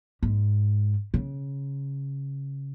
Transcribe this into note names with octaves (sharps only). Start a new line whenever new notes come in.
G#2
C#3